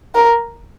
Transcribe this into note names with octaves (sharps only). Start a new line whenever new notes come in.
A#4